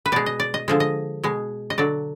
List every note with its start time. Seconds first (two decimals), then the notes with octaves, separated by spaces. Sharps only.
0.06 B4
0.12 B2 G#3 D5
0.26 D#5
0.40 D5
0.54 D#5
0.68 D3 F3 G#3
0.80 D#5
1.23 B2 G#3
1.70 D#5
1.78 D3 F#3 D5